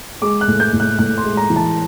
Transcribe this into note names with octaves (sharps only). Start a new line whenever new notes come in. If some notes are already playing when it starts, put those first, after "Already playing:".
G#3 D6
F#6
A2
G6
A2
F#6
A2 F#6
C6
G#3
A#5
E3
A5